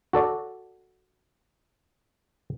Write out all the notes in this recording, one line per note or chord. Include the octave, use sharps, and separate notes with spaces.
F#4 A4 D5